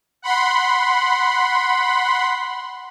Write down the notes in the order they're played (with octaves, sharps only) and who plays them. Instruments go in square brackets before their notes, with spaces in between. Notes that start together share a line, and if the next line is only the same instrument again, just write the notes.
[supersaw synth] F#5 B5 C6